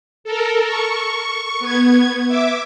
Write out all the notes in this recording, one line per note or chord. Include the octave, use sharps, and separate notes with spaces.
A4 A#4
C#6
B3 G#6
E5 D6